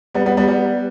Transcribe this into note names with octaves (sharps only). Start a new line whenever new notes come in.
G3 B3
G3 B3
G3 B3
G3 B3